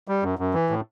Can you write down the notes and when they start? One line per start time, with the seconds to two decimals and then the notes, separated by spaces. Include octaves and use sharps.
0.08 G3
0.23 F#2
0.39 F#2
0.54 E3
0.70 A2